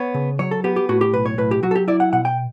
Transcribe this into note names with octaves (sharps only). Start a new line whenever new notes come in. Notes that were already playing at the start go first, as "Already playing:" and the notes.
Already playing: B3 C#5
C#3
F#3 C#5
A4
B3 G4
G4
A2 F#4
G4
B1 B4
C#5
A2 B4
G4
F#3 F#4
A4
G4
E4 D5
F#5
B2 F#5
G5